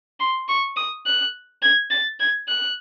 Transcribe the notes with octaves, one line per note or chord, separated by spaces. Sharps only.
C6
C#6
D#6
F#6
G#6
A6
G#6
F#6